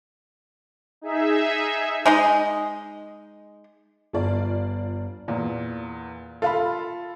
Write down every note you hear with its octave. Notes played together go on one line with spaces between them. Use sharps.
D#4 G#4 E5
G#3 D#4 D#5
G1 F4 D5
E2 A#2
F4 A4 F5 B5